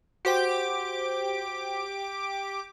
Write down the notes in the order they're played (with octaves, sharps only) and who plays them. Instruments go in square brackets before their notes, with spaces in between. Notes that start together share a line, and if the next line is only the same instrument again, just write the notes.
[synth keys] F#4 C5 G5 [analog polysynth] G4 D6 D7